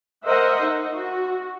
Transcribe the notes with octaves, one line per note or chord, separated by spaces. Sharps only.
A#4 C5 D#5 E5 F#5
D#4
F#4